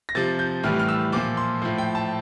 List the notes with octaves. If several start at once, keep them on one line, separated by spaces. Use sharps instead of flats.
A#6
C3 F3 A6
G6
A2 E3 G3 F6
F6
E6
A#2 F3 D6
C6
A2 F3
G5
A5